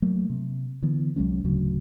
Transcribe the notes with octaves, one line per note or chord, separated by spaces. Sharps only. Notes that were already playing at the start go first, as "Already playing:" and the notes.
F#3 A3 A#3
C3
D3 E3 B3
C2 F#3 G#3 C#4
D1 D2 C#3 F#3